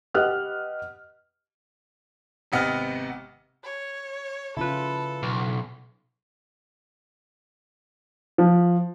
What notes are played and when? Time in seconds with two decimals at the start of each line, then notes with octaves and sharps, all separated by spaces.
0.14 G4 B4 D#5 F#5 F6 F#6
2.52 G#1 C3 B3 D#5 F6
3.64 C#5
4.57 C#3 C#4 E4 F4 A4 B4
5.23 B1
8.38 F3